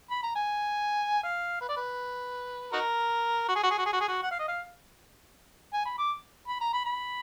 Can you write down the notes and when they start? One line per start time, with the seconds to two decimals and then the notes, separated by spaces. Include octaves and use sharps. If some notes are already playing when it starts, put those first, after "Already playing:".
0.11 B5
0.23 A#5
0.35 G#5
1.23 F5
1.61 B4
1.69 D5
1.77 B4
2.73 D#4 F#4 A#4
3.48 F#4
3.56 G#4
3.63 F#4
3.71 G#4
3.78 F#4
3.86 G#4
3.93 F#4
4.01 G#4
4.08 F#4
4.23 F#5
4.32 F5
4.39 D#5
4.48 F5
5.73 G#5
5.86 B5
5.98 D6
6.48 B5
6.61 A#5
6.74 B5
6.85 B5